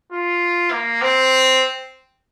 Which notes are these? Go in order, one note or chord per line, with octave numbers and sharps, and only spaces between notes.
F4
A#3
C4